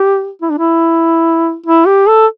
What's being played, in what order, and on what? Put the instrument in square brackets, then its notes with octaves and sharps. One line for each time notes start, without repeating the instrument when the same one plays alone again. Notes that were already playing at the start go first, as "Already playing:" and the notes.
Already playing: [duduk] G4
E4
D4
E4
E4
G4
A4